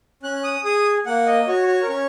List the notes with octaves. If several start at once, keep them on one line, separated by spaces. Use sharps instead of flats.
C#4 F#6
D#6
G#4 D#6
A#3 F#5
D#5
F#4 C#5
C#5
A#4
C#4 C#5